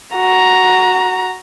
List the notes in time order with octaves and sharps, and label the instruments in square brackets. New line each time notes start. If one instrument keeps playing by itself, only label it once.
[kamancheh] F#4 A#5